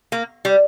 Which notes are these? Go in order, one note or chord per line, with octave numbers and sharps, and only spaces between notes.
A#3
G3